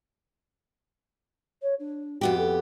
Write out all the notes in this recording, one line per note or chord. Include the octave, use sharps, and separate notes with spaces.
C#5
D4
F2 B3 F#4 G4
A4